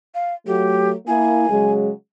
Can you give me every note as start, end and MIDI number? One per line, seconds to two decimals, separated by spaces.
0.15 0.34 77
0.47 0.94 54
0.47 0.94 57
0.47 0.90 67
1.08 1.47 58
1.08 1.47 64
1.08 1.72 80
1.49 1.90 49
1.49 1.90 54
1.49 1.90 56